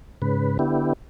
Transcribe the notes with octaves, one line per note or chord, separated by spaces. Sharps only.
G#2 C#3 B4
D3 B3 E4 G4